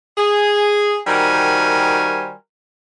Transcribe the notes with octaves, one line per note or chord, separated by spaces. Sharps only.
G#4
D#3 G3 F#4 A#4 C5 G#5